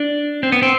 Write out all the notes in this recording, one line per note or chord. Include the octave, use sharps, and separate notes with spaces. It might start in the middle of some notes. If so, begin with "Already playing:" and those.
Already playing: D4
C4
B3
C4